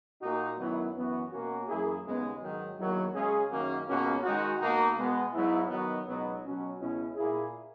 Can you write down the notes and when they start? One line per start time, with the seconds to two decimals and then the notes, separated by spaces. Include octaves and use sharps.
0.22 A#2 A#3 D#4 F#4
0.58 F#2 D#3 F#3 B3 E4
0.95 F#2 E3 B3 F#4
1.31 B2 A#3 C#4 F#4
1.68 F#2 E3 A#3 E4 G#4
2.04 D#2 C#3 G#3 B3 D#4
2.40 G#2 D#3 F#3
2.78 E2 D#3 F#3 A#3
3.14 C#3 G#3 C#4 G#4
3.50 F#2 D#3 A#3 C#4 F#4
3.87 C#2 B2 A#3 C#4 F#4
4.24 D#3 G#3 D#4 F#4
4.59 B2 A#3 D#4 F#4
4.96 B2 G#3 B3
5.33 G#2 F#3 B3 E4
5.69 D#3 F#3 B3 D#4 F#4
6.05 C#2 B2 F#3 B3 D#4
6.42 B2 F#3 C#4 F#4
6.79 C#2 B2 G#3 C#4 E4
7.16 A#2 A#3 E4 G#4